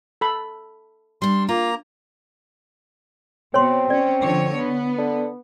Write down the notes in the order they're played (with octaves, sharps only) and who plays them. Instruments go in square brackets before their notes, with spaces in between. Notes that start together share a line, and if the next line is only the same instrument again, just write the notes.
[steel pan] A4 B5
[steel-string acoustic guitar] G3 D4 [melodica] C6
[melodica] A#3 A#5 [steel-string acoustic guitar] F4
[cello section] B2 [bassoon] C4 [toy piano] C#5 C6
[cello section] C#4 [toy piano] D5
[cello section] D3 F3 C#5
B3
[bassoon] D3